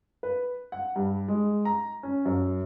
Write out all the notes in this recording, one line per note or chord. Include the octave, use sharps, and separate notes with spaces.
B4
F#5
G2
G#3
A#5
C#4
F#2